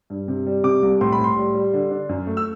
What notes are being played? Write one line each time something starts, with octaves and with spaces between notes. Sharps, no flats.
G2
C3
G3
C3 D6
C2
A2 C6
B5
A2
C6
G3
G3
D3
D4
F#2
A3
E6